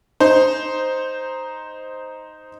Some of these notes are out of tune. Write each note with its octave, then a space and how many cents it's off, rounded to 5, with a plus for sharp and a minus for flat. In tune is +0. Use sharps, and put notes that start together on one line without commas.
D#4 +0 C5 +0